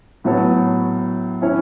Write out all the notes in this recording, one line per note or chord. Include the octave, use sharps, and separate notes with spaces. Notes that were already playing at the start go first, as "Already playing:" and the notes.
A2 F#3 B3 A4 C#5
E3 C#4 E4 C#5